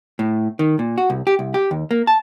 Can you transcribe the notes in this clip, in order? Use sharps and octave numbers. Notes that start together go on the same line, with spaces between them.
A2
D#3
A#2
F#4
C2
G4
C2
G4
D#2
A#3
A5